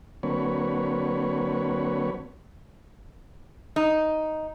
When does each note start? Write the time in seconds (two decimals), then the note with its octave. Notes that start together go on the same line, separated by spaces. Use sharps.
0.23 D3 F#3 A#3 C4 B4 C#5
3.76 D#4